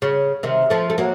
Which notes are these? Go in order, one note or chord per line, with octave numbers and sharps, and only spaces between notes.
C#3
C3 D#3
F3 A3
A3
F#3 A#3